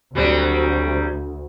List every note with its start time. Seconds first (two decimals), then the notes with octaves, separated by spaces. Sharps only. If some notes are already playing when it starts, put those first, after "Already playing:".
0.15 D2 F#3 G3 C4